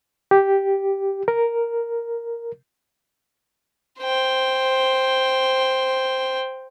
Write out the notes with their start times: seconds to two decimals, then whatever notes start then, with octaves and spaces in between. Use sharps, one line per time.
0.31 G4
1.28 A#4
4.00 C5 G5